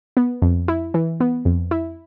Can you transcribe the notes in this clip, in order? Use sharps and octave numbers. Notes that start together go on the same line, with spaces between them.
B3
F2
E4
E3
B3
F2
E4